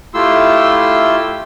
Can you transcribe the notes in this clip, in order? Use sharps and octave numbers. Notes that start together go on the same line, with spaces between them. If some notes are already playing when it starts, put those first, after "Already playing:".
A3 E4 F4 G4 C6 E6